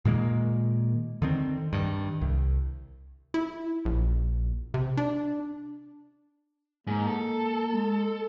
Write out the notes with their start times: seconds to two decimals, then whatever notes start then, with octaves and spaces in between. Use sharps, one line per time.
0.05 A#2 D#3 G#3 A#3
1.22 D3 D#3 C4
1.73 G2 D#3
2.21 C2
3.34 E4
3.85 A#1
4.74 C3
4.97 D4
6.87 G#2 A#3
7.07 A4
7.74 G#3